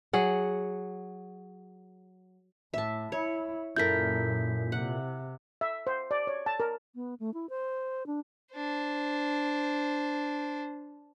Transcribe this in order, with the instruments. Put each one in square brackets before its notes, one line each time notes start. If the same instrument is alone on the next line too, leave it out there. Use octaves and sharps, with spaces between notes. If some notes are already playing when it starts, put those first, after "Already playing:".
[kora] F#3 G#4 F#5
[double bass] A2 [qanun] E5 A5
[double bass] E4 [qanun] C#5
[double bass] F#2 [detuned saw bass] A#2 [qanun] E4 A4 A#4 [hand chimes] G6 B6
[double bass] C3 [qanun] F#5
[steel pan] E5
C5
D5
C#5
A5
A#4
[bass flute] B3
A3
E4
C5
D4
[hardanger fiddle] D4 C5